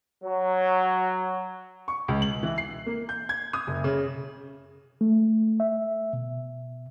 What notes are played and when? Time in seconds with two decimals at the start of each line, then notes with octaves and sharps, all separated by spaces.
0.23 F#3
1.88 C#6
2.08 C#2
2.22 F#7
2.43 E3
2.58 C7
2.86 A#3
3.09 G6
3.29 G#6
3.53 D#6
3.67 F#1
3.84 C#3
5.01 A3
5.60 E5
6.13 B2